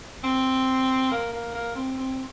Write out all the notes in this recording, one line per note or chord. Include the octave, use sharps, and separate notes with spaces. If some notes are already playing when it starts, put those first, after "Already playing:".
C4
A#3
A#3
A#3
C4
C4